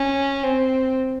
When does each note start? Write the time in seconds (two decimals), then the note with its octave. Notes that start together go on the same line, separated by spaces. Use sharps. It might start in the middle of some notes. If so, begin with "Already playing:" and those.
Already playing: C#4
0.43 C4